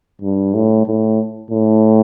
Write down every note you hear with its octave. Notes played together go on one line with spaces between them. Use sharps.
G2
A2
A2
A2